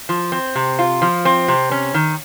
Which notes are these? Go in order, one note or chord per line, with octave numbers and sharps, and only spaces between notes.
F3
C4
C3
F4
F3
C4
C3
C#4
D#3